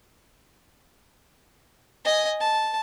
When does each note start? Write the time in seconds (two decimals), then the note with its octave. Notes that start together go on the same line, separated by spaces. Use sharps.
2.05 D#5 G#5
2.40 A5